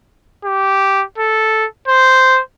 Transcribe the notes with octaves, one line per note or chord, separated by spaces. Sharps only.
G4
A4
C5